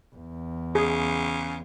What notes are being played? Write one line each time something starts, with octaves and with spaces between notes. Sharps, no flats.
E2
C#3 G#4